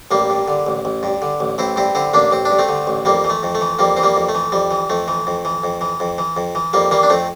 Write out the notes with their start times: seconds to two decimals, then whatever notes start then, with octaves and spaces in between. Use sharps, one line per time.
0.11 A1 G3 A#3
0.30 G2
0.48 D3
0.67 A1
0.85 A1
1.03 G2
1.22 D3
1.40 A1
1.58 A1 C4 E4
1.76 G2 C4 E4
1.95 D3 C4 E4
2.14 A1 A#3 D4
2.31 A1 C4
2.45 D4
2.51 G2
2.59 A3 C4
2.69 D3
2.87 A1
3.05 F2 G3 A#3
3.24 E3
3.30 A3
3.43 F2
3.55 A3
3.61 E3
3.79 F2 G3 A#3
3.96 E3 C4
4.03 G3 A#3
4.15 F2
4.29 A3
4.35 E3
4.52 F2 G3
4.71 E3
4.90 F2 A3
5.08 E3
5.27 F2
5.45 E3
5.63 F2
5.81 E3
6.00 F2
6.18 E3
6.37 F2
6.55 E3
6.73 F2 G3 A#3
6.91 E3 G3 A#3
7.03 D4
7.10 F2 A3 C4